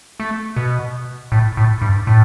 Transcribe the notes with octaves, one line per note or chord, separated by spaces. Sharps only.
A3
B2
A2
A2
G2
A2